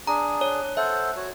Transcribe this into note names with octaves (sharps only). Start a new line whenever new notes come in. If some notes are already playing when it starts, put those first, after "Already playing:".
D4 G#4 A#5
C#5
A4 C5 E5 F#5
F#4 C#5